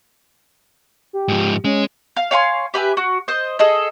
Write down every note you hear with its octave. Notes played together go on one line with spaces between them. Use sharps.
G4
G#2 F3
G#3 C#4
F5
C#5 F5 G#5 C6
G4 B4 E5 G#5
F#4
C5 D#5
G#4 A4 D#5